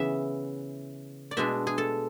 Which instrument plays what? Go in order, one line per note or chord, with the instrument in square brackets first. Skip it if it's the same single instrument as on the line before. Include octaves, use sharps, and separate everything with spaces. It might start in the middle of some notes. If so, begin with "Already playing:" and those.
Already playing: [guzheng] C#3 E3 B3 E5
D5
B2 G#3 D4 E5
G#4
A4